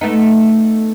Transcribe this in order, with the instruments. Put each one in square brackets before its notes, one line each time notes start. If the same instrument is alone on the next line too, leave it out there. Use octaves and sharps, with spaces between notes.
[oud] A3 B3 D#4